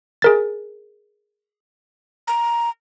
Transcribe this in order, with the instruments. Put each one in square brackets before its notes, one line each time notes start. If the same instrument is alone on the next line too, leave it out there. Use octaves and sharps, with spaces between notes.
[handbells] G#4 A#4 A6
[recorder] A#5